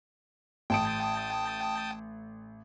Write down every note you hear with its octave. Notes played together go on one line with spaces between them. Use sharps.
A1 G5 A5 D#6 D7